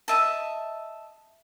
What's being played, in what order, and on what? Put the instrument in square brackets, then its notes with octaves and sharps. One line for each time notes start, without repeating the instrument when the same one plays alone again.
[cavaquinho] D#5 E5 A5